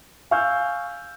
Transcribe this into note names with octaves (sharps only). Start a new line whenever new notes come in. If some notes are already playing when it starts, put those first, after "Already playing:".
F5 G#5 C#6 E6 F6 G6